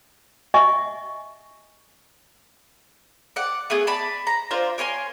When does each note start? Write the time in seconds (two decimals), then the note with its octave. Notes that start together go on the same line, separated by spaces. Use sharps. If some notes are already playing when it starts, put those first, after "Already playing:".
0.54 D#5 E5 F#5 G#5 C#6
3.36 D5 F#5
3.70 A3 B3 G#4
3.87 D5 A5 B5
4.27 A#5
4.51 D4 F4 A#4 C5
4.78 A#4 C#5 G#5 C6